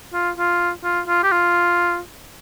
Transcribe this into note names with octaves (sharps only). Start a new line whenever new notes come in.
F4
F4
F4
F4
G4
F4